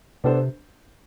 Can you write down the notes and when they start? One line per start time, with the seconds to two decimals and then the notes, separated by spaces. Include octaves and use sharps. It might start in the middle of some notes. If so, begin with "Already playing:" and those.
0.24 C3 B3 D4 A4 C5